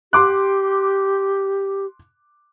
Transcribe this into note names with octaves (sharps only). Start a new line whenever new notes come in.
G4 C6 D6 F#6